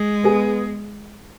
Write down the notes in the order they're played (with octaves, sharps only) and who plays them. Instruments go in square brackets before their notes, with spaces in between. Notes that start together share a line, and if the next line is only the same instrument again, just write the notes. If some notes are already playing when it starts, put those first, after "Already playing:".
Already playing: [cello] G#3
[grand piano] B3 G#4